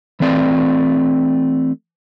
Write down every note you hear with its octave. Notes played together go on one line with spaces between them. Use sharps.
E3 A3 C4 D5